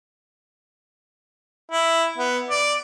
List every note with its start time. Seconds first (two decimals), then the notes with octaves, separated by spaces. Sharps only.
1.71 E4
2.18 B3
2.50 D5